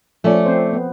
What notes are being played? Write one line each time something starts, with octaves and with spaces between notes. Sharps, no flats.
F3 A3 C#4 D5
C4 C5
B3